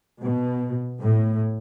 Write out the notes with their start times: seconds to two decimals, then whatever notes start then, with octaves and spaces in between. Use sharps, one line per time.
0.20 B2
1.01 A2